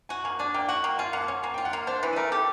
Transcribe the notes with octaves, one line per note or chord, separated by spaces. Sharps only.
F#4 G#5
A#3 G#5
D4 G#5
A#3 G5
F#4 F#5
A#3 G5
F4 G#5
A#3 F#5
A5
C#4 G#5
A#3 G#5
G5
F4
F#5
A#3
D4 C5
E3 B4
B4
A3 A#4
G4 A4